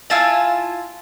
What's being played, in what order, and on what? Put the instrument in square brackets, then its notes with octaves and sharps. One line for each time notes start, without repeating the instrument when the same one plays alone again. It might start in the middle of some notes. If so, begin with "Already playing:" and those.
[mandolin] E4 F4 G#5 A5